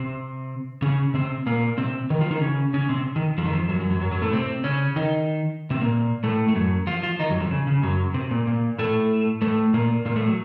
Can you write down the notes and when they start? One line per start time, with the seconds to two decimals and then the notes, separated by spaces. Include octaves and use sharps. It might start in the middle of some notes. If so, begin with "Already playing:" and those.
Already playing: C3 C4
0.82 C#3 C#4
1.14 C3 C4
1.46 A#2 A#3
1.78 C3 C4
2.10 D#3 D#4
2.20 F3 F4
2.30 D#3 D#4
2.41 C#3 C#4
2.74 C#3 C#4
2.89 C3 C4
3.16 D#3
3.38 F2 F3
3.45 D#3
3.53 F2 F3
3.69 F#2 F#3
3.79 F#2 F#3
3.90 F#2 F#3
4.01 F#2 F#3
4.11 F#2 F#3
4.22 A2 A3
4.32 C3 C4
4.64 C#3 C#4
4.96 D#3 D#4
5.70 C3 C4
5.81 A#2 A#3
6.24 A2 A3
6.48 A3
6.55 F#2 F#3
6.87 F3 F4
7.03 F3 F4
7.19 D#3 D#4
7.30 F#2 F#3
7.40 F2 F3
7.51 C#3
7.67 C#3
7.82 F#2 F#3
8.14 C3
8.31 A#2
8.47 A#2
8.79 A2 A3
9.42 A2 A3
9.73 A#2 A#3
10.05 A#2 A#3
10.16 A2 A3
10.27 F#3